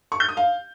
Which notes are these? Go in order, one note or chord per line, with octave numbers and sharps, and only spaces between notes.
C#6
G6
D#6
F5